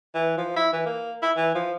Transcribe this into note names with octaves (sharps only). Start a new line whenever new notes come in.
E3
F3
E4
E3
A#3
E4
E3
F3